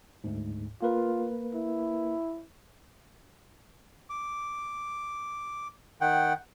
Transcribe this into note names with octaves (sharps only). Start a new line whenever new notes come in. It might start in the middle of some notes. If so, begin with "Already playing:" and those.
D2 G#2
A#3 F4 A#4 B4
E4
D6
D#3 F#5 G5